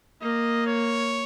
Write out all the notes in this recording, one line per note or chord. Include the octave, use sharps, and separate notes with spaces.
A#3 D#5
C#5